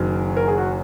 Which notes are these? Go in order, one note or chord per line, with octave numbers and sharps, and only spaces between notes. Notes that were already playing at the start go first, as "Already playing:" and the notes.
Already playing: F#1 F#2 D#3 F#3
A#4
G#4
F#4